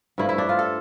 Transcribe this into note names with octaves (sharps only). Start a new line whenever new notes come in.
G2 F3 A3 E4
E4
D4
F4
A4